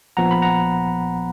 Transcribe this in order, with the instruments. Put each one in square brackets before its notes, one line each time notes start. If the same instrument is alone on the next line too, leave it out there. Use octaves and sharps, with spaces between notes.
[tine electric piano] A#1 A#2 F3 B3 F#5 A#5
B5
F#5 A#5